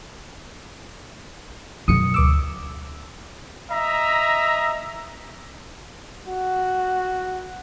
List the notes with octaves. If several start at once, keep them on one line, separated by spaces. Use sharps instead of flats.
F#2 B2 D#6 C#7
D2 D6 E6
D#5 E5 A#5
F#4